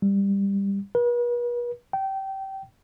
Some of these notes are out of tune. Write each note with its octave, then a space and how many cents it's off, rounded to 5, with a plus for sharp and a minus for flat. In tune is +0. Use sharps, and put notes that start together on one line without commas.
G3 +15
B4 -45
G5 -20